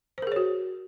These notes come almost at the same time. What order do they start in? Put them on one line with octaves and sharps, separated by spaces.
C5 A#4 G#4 C#5 F#4